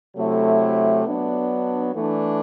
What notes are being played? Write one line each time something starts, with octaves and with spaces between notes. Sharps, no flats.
C3 F#3 A3 E4
F#3 B3 D4
E3 A3 D4